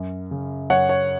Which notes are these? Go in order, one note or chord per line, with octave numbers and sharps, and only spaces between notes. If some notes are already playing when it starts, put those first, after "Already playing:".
Already playing: F#2
C#3
F#2 C#5 F#5
C#5